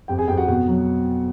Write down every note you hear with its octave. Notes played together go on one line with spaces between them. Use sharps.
F2 G4 G5
G#4 G#5
F2 G4 G5
F#4 F#5
B2 F#4 F#5
F#3